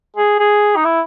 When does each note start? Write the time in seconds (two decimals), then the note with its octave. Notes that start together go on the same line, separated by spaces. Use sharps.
0.17 G#4
0.40 G#4
0.76 D#4
0.85 E4